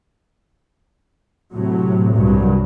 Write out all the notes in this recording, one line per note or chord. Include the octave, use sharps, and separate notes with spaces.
A2 C3 F#3
C2 G2 F#3